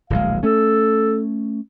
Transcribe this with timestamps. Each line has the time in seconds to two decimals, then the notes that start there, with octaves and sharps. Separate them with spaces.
0.10 D1 A#1 G#3 F5
0.43 A3 C#4 A4